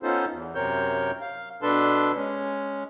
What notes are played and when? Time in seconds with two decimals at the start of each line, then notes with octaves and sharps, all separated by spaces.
0.03 B3 C#4 D#4 F4 A4 C5
0.30 E2
0.55 F#2 C3 C4 A#4 C#5 G6
1.21 F5
1.62 B2 D4 A4 B4 A5 C6
2.15 G#3 C#4